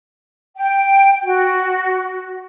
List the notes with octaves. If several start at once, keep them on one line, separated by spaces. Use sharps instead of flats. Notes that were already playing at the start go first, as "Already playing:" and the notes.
G5
F#4